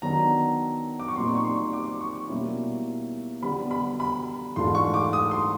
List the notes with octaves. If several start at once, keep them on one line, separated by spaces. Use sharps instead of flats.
D#3 F#3 B3 D4 A#5
D6
C#6
A#2 G3 C4 D#4 C6
C#6
C6
D6
C#6
B2 G3 A#3 C#4 E4
D3 G3 B3 B5
B5
B5
G#2 E3 A3 D4 F4 C6
C#6
D6
D#6
C6